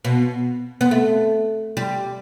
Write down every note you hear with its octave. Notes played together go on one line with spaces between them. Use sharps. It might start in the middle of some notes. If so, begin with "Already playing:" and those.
B2
B3
A3
G3